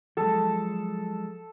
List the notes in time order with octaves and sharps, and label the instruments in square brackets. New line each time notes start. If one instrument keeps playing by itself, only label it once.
[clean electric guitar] F3 F#3 G#3 [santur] A4